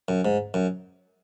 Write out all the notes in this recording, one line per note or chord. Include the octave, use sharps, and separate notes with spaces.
F#2
G#2
F#2